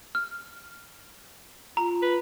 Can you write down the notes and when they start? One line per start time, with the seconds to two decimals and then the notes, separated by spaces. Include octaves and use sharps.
0.15 F6
1.77 F4 A#5
2.02 B4